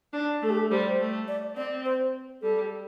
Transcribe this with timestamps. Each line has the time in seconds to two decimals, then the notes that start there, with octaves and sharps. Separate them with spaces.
0.13 D4
0.42 A3 A4
0.50 G4
0.59 A4
0.71 G3 C5
0.99 A3
1.28 D5
1.56 C4 D5
1.85 C5
2.42 G3 A4